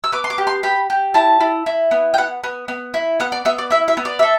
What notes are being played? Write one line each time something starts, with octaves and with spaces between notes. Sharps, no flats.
E6
B3 D6
C6
D6
G4
C6
G4 B5
G4
E4 A5
E4
E4
B3
G5
B3 F#5
B3
B3
E4
B3 F#5
D5
B3 E5
D5
E4 E5
E5
B3
D5
A4 E5